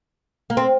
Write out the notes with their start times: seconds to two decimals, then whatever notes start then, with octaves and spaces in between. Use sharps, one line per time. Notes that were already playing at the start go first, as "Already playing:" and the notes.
0.50 A#3
0.57 C4